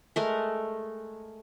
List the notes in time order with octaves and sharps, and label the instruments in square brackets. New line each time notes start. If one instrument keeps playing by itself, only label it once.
[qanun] G#3 A3 A#4